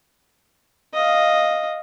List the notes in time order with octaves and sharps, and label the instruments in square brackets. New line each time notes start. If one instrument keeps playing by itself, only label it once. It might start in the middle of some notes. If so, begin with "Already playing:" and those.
[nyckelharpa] D#5 F5